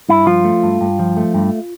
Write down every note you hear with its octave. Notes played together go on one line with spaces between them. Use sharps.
G2 E4
F3 F4
A3
G2
G2
F3
A3
G2